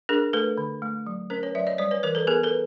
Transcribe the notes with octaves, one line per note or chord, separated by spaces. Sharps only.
D4 G#4 A#4
A3 A4 B4
D3
A3
F#3
C#4 A#4 C5
B4 C#5
F#3 D5 E5
C#5 D#5
G3 C5 D5
B4 C#5
E3 A#4 C5
A4 B4
B3 G#4 A#4
A4 B4